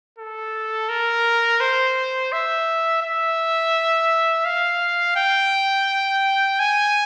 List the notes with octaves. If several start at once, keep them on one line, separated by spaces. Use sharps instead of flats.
A4
A#4
C5
E5
E5
F5
G5
G#5